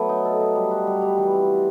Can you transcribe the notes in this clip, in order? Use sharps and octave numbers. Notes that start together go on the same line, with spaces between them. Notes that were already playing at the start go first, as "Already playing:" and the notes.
Already playing: F#3 A3 B3
D#4
A4
D#4
G3
F#4
G3
G3
E3
C4
E3